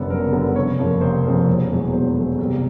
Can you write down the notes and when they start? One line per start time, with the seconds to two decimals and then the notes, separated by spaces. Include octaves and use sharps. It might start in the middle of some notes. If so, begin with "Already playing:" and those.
Already playing: F#1 F#2 D3 G3 B3 A4
0.10 F#1 A#4
0.32 F#2 D3 G3 B3
0.56 F1 C#5
0.78 F2 C#3 F3 A#3
1.01 F1 C5
1.24 F2 C#3 F3 A#3
1.47 E1
1.71 E2 B2 F#3 A3
1.93 E1 C5
2.16 E2 B2 F#3 A3
2.39 C2